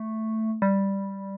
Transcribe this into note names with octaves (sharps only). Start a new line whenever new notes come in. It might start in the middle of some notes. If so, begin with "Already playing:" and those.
Already playing: A3
G3